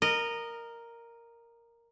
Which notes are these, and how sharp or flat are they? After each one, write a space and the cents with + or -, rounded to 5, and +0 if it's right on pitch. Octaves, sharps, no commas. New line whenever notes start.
A#4 +0 D#5 -20